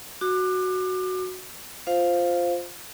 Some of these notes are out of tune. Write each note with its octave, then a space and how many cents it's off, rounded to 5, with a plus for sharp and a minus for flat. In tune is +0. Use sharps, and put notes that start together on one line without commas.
F#4 +0 D6 +30
F4 +0 C5 +0 F5 +0